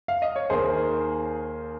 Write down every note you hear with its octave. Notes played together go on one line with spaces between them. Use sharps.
F5
D#5
C#5
D#2 D#3 A#3 G#4 C5